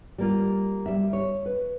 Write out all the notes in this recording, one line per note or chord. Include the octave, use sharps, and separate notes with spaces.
G3 A#3 F4
G3 E5
C#5
B4